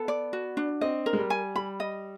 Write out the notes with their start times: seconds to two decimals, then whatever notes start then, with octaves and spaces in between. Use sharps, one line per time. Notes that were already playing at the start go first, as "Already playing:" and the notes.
Already playing: B3 A4
0.08 D5
0.33 F#4
0.57 D4
0.81 C4 D#5
1.06 A#4
1.13 G#3
1.18 G3
1.30 G#5
1.55 G3 B5
1.80 D#5